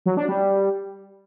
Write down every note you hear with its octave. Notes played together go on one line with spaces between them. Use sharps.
F#3
D4
G3